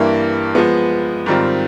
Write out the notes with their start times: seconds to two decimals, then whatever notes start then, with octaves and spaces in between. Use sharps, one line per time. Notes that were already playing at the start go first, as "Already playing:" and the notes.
Already playing: G2 E3 G3 A#3
0.55 F3 G#3 B3
1.26 G#2 D#3 G3 C4 F4